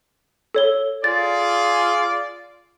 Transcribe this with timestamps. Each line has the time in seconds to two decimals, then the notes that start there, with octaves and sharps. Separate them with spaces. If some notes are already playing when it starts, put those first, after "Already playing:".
0.55 A4 C#5 G7
1.04 F4 G#4 D5 A6